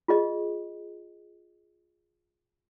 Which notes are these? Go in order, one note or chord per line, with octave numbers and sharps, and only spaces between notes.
F4 G#4 D#5